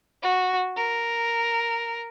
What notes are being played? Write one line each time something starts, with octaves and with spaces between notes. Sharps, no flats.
F#4
A#4